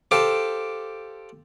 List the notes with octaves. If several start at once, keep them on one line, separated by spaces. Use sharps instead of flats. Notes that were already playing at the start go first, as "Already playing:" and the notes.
G4 A4 C5 F5 D6